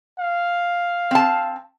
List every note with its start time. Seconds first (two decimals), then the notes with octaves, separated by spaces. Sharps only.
0.19 F5
1.11 C4 A5